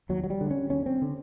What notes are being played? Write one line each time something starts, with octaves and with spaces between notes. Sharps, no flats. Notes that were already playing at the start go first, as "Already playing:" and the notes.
D#2 F#3
F#3
G3
D3
C#4
D#2 C#4
C4
D3